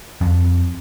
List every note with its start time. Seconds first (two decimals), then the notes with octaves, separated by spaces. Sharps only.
0.21 F2